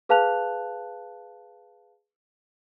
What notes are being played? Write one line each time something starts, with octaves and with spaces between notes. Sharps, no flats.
G#4 B4 F5 A5 F#6 F7